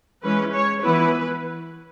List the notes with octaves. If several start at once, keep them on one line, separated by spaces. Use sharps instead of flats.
E3 G#3 C#4 B4
C#5
E3 B3 E4 B4